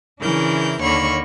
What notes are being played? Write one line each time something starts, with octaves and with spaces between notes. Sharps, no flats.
C#3 E3 D4 E4 A#4 G6
D#2 D3 A#3 C#5 B5 C#6